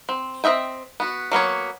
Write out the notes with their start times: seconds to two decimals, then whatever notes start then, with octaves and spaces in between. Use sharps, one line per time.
0.09 C4
0.44 C4 F#4 D#5 E5 G5
1.00 B3 F#4
1.32 F#3 A#3 B3 C#5